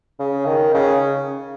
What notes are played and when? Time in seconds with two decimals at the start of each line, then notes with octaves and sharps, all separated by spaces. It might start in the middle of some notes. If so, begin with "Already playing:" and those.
0.19 C#3
0.46 D#3
0.74 C#3